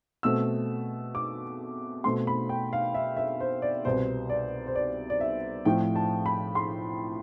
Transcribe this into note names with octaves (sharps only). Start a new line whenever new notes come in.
B2 A3 C4 E6
D6
B2 A3 C4 C6
B5
G5
F5
E5
E5
C5
D5
C2 B2 B3 C5
D5
C5
D5
D5
E5
A2 F3 A3 C4 G5
A5
B5
C6